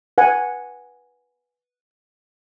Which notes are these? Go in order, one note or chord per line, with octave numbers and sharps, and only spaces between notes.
B4 F#5 G#5